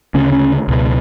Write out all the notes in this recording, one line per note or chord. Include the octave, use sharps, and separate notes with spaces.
D2 C#3 C#4
C#4
C#2 B2